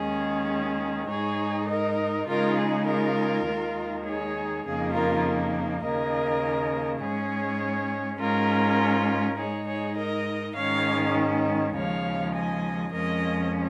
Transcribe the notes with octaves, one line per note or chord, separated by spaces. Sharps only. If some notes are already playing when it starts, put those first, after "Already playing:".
Already playing: D#2 D#3 G#3 C#4 G#4
G#4
G#2 G#3 D#4 G#4 C#5
A#4 D#5
C#3 G#3 D#4 F4 A#4
G#4
F4 A#4
D#2 D#3 G#3 D#4
G#4 C#5
F2 C#3 A#3 D#4 G#4
F4 A#4
D#2 C#3 A#3 A#4 D#5
G#2 G#3 C#4 G#4 C#5
G#2 G#3 C#4 F4 A#4
G#2 G#3 D#4 G#4 C#5
G#4 C#5
A#4 D#5
G#2 D#3 G#3 C#4 C#5 F5
D#2 C#3 F3 G#3 C#5 F5
D#5 G#5
F2 F3 G#3 C#4 A#4 D#5